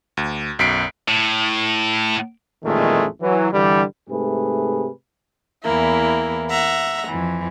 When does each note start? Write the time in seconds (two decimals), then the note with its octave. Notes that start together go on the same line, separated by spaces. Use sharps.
0.17 D2
0.59 B1 F#2 B6 C7 D7
1.08 A2
2.63 A1 F2 A#2 D#3 G#3 A3
3.21 E3 F#3
3.52 G2 D3 E3 G3
4.10 G#2 C3 A3 G#4 B4
5.63 E2 E3 A#3 E4
6.49 E5 F#5 A#5
7.08 F2 E3